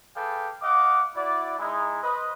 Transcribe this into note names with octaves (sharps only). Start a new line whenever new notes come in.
G#4 A4 B4 D5 F5 G5
D#5 F5 F#5 D6
E4 F#4 D5
G#3 D#4 E4
B4 C5 D#5